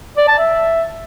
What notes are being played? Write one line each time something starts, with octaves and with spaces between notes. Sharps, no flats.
D5
A5
E5